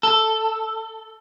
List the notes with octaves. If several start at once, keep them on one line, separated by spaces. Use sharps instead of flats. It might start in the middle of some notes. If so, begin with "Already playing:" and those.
A4